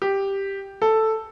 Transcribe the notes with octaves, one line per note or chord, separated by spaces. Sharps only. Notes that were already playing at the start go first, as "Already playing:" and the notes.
G4
A4